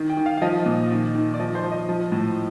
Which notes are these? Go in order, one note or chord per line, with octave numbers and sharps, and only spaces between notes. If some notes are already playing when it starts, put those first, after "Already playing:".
Already playing: D#3
G5
D#3
F5
F5
F3 D#5
A#2
D#3
D#3
D5
F3 D#5
C5
F3
D#5
F3
A2